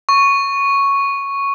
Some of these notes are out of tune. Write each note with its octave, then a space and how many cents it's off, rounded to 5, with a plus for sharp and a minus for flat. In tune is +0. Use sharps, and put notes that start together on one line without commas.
C#6 +0